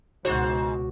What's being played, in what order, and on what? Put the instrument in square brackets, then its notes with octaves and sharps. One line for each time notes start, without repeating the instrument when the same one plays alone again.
[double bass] C#2 B2 [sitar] G#2 C5 [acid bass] F#4